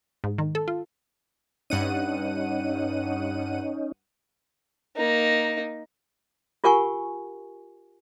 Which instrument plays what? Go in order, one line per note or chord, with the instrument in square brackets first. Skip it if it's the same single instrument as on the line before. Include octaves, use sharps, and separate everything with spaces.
[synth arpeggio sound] G#2
D#3
A4
F4
[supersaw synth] G2 F#5 D#7 [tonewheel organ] C#4 D#4
[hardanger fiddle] A#3 D#4
[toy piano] F4 G4 A#4 F#5 G#5 C#6